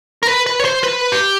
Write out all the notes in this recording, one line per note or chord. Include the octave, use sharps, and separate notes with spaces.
A#4
B4
B4
C#5
C5
B4
G4